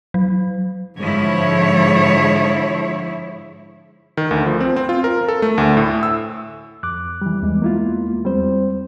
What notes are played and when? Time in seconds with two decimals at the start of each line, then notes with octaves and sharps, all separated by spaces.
0.14 F#3
0.99 G#2 D3 F3 E4 C#5
4.17 D#3
4.31 D2
4.46 F3
4.60 C4
4.76 C4
4.89 F4
5.04 A#4
5.28 A4
5.42 A3
5.58 D2
5.77 A2
6.03 E6
6.83 F2 D6 F#6
7.21 E3 G3
7.43 E2 G#3
7.62 A#3 E4 F4
8.25 G3 C4 C5